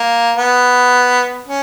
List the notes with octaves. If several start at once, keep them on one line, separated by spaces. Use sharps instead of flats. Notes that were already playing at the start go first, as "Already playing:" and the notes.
Already playing: A#3
B3
C#4